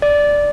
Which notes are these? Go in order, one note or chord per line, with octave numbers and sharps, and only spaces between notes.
D5